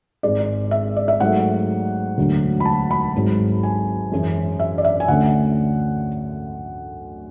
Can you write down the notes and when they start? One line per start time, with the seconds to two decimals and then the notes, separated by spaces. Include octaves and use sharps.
0.23 G#1 G#2 G#3 D5
0.71 E5
0.96 D5
1.08 E5
1.20 G#2 F#3 A3 F#5
2.17 E1 D2 D3 F#3
2.60 B5
2.65 A5
2.91 B5
3.15 G#1 G#2 F#3
3.63 G#5
4.12 F#2 E3 G#3 C#4
4.60 E5
4.78 D5
4.85 E5
5.00 G#5
5.08 D2 D3 A3 C#4 F#5